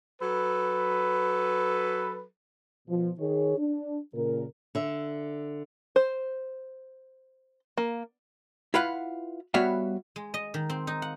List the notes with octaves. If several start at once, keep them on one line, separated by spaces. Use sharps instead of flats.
F#3 A4 B4
B2 F3
D#3 G#4 C#5
D4
A#2 C#3 A#4
D3 E5
C5
A#3
E4 F4 B4 F5 F#5
G3 B3 F#4 C#5 E5 F5
G#3
D#5
D#3
C4
D#4
F#5